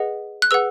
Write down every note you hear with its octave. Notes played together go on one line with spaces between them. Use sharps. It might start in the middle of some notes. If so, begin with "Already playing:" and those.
Already playing: G#4 B4 D#5 F#5
F#6
G#4 B4 F#5 E6